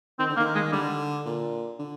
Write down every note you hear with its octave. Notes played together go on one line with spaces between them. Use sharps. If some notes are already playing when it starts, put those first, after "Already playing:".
D#3 C4
D3
D#3 A#3
G#3
D3 G3
A#2
D3